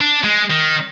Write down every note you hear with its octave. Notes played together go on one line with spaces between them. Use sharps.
D4
G#3
D#3